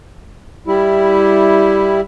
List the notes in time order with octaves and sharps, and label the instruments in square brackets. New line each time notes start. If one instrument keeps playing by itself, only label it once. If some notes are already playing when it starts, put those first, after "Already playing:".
[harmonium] G3 E4